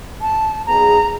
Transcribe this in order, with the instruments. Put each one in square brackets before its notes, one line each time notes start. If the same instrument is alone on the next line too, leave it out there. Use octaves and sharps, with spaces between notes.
[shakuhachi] A5
[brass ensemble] F#3 B3 D#4 G#4 [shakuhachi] A#5